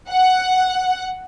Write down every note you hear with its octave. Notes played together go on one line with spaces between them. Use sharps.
F#5